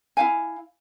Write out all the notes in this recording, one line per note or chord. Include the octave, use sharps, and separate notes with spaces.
E4 F5 G#5